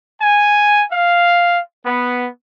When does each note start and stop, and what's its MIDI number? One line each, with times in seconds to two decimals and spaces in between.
0.21 0.83 80
0.92 1.60 77
1.86 2.28 59